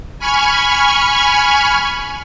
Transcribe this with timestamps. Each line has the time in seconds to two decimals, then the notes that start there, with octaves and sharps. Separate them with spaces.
0.19 G#5 B5 C#6 F6 G#6